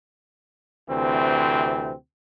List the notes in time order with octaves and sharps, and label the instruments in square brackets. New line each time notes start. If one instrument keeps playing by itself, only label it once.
[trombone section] D2 C3 E3 C4